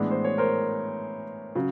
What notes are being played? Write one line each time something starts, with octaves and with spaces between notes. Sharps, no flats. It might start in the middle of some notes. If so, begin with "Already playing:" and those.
Already playing: A2 E3 G#3 B3 D4
C5
C#5
A#4 C5
C#3 F#3